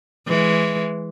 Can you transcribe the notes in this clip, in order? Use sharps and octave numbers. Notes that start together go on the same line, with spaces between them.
E3 G#3